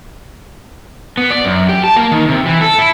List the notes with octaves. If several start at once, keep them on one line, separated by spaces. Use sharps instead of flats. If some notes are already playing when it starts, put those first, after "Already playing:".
B3
D5
F#2
G4
A5
A#3
D#3
C3
E3
A4
E4